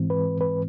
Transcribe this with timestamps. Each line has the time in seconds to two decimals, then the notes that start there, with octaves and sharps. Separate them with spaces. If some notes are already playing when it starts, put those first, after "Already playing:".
Already playing: G#2 E3 G#3 C4
0.10 B4
0.41 B4